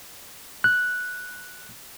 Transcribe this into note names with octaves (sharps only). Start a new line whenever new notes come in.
F#6